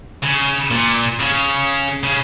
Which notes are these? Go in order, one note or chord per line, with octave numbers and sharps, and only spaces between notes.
C#3
A#2
C#3
C#3